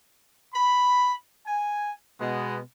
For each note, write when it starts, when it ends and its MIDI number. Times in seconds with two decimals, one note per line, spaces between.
0.54 1.12 83
1.47 1.92 80
2.20 2.60 47
2.20 2.60 56
2.20 2.60 59